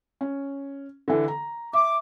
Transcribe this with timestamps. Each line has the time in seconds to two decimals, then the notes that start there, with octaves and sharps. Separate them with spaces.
0.21 C#4
1.08 D3 E3 A4
1.28 A#5
1.73 E5 D6